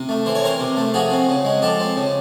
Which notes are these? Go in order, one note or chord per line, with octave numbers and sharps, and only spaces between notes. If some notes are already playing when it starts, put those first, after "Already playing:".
Already playing: C3
A3
E3 C5
C#5
C4 A#4 C5
C3
A3
F3 F#4 G#4
C4
C#3
G#3
F3 G4 A4
C4
C#3